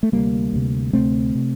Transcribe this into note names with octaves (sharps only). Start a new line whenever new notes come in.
A3
D2 C3 G3 A#3
D2 C3
D2 C3 A3 C4
C3